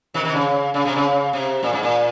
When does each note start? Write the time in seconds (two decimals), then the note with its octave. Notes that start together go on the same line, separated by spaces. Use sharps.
0.14 C3 D#3
0.24 C3 D#3
0.34 C#3
0.74 C#3
0.85 C3
0.96 C#3
1.33 C3
1.63 A#2
1.73 G#2
1.83 A#2